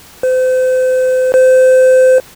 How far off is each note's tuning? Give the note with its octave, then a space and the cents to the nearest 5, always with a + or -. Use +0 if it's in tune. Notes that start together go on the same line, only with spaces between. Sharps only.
C5 -35
C5 -25